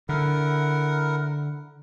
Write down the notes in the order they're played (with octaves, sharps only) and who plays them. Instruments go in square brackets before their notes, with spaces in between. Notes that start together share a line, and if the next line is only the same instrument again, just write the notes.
[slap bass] D3 [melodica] E4 A#4 F#5